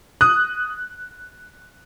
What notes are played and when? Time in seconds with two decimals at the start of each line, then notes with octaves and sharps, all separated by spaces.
0.21 D#6 F#6